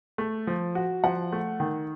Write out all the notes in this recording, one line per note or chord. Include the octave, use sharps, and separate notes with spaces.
A3
F3
F#4
F3 F#5
A3
D#3